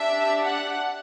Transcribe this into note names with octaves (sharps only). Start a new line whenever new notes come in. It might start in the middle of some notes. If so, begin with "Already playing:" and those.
Already playing: D4 G4 E5
F#5